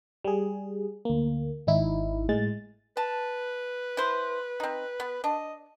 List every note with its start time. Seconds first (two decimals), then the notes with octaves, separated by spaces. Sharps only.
0.25 G3 G#4
1.05 D2 A#3
1.67 G#1 D#4 E4
2.29 A2 G#3 A6
2.97 B4 A5
3.97 E4 C5
4.60 C4 D#4
5.00 B3
5.24 D4 D#5